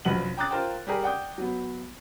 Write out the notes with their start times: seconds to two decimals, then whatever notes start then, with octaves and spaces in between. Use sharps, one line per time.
0.05 F1 A#1 F#2 B4 F#5 F#7
0.37 G5 A#5 D6 D#6 F#6 A6
0.51 F4 A#4 C5 G5
0.87 G3 G4 G#4 A#4
1.02 D5 F#5 G5 D#6 G6
1.38 F#3 B3